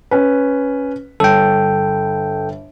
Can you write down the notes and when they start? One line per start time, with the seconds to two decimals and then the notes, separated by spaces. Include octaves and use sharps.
0.11 C#4 B4
1.20 G1 A4 G5